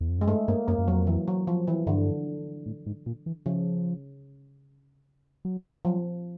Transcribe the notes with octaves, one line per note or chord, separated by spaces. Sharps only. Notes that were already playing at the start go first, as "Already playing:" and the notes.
E2
F2
F#2 G#3
G2 A3
G2 A#3
F#2 A#3
F#2
F2 F#3
E3
F#3
F3
E3
G2 D3
A2
G#2
A#2
E3
C#3 F3
F#3
F3 F#3